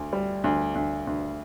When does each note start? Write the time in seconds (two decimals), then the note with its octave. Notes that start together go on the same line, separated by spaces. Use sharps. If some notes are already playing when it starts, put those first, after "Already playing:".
Already playing: D2
0.13 G3
0.44 D2
0.75 D2
1.07 D2